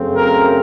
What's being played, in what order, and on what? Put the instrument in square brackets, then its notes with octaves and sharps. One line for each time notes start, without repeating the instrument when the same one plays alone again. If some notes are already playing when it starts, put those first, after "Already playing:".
Already playing: [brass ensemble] F#2 C#3 F#3 A3 C4
A#4